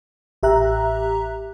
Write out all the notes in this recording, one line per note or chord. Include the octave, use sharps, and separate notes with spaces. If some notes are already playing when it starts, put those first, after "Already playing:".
A1 G4 E5 A#5 F#6